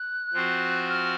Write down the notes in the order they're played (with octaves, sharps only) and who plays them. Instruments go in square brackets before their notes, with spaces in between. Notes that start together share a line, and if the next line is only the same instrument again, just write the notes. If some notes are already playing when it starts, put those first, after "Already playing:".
Already playing: [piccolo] F#6
[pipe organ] F3 C4 F#4 C5
[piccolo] F6